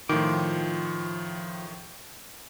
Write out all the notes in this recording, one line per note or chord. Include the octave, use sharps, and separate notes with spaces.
A2 D#3 F3 F4 D6